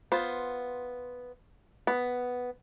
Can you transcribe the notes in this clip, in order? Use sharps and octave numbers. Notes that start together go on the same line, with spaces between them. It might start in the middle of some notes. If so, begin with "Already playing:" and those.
B3 F4 C5
B3